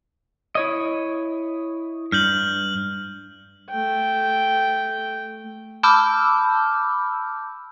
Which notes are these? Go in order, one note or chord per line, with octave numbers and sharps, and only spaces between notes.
E4 C#5 D#5
G2 F6 G6 F#7
A3 G5
A5 B5 D6 E6 F6 G6